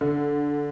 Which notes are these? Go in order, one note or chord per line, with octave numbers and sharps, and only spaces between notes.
D3